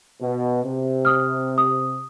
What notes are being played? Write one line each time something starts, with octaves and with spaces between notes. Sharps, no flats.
B2
C3
D#6 F6
D#6